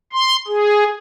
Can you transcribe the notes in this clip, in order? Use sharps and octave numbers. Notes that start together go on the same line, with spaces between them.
C6
G#4